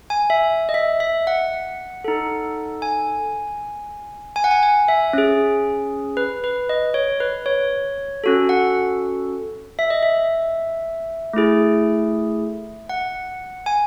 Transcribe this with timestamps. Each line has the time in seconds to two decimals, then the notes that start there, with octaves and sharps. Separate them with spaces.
0.10 G#5
0.30 E5
0.69 D#5
0.74 E5
1.00 E5
1.27 F#5
2.04 D#4 A4
2.82 G#5
4.36 G#5
4.44 F#5
4.51 G#5
4.63 G#5
4.88 E5
5.13 C#4 G#4
6.17 B4
6.44 B4
6.69 D#5
6.94 C#5
7.20 B4
7.46 C#5
8.24 C#4 F#4 A4
8.49 F#5
9.79 E5
9.90 D#5
10.03 E5
11.33 A3 E4 G#4
12.89 F#5
13.66 G#5